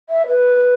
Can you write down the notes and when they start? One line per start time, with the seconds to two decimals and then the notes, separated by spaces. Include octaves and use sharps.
0.10 E5
0.28 B4